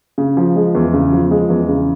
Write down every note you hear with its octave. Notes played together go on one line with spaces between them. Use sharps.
C#3
F3
G#3
E2
C#3
F3
G#3
E2
C#3